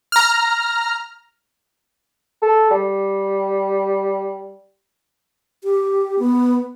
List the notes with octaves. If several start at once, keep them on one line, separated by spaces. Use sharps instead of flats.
A#5 F6
A4
G3
G4
B3